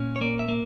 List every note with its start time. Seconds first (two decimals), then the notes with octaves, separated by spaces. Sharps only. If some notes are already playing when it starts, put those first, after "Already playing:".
Already playing: A#2 C#4
0.16 C#5
0.21 A#3 D5
0.39 E5
0.49 A#3